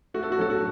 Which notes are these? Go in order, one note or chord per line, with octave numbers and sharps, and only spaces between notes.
A3 F#4
A4
F#4
F#3 A4
F#4